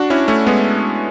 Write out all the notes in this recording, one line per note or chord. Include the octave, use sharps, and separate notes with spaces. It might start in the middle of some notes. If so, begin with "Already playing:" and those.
Already playing: D4 F#4
C#4 E4
A3 C#4
G#3 B3